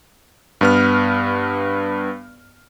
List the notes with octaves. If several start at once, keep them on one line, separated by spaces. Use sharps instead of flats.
G2 B3 F6